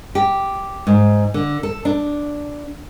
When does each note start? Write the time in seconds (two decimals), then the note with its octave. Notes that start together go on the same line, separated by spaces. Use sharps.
0.15 G4
0.87 G#2
1.34 D3
1.63 A4
1.85 D4